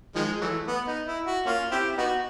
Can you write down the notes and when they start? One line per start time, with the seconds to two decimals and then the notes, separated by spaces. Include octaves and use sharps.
0.15 D#3 F3 G#3
0.41 E3 F#3 A3
0.67 B3
0.87 D#4
1.06 E4
1.26 F#4
1.46 A#3 C#4 F4
1.71 C4 E4 G4
1.98 B3 D#4 F#4